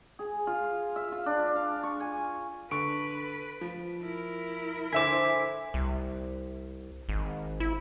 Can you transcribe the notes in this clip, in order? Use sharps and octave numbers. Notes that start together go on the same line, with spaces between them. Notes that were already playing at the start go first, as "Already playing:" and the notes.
G#4
F4
E5
F4
D4
F5
C#6
G#5
D3 B4 C#6 D7
F3
E4 A#4
D3 C5 E5 G#5 D6 B6 E7
C2
G#1
E4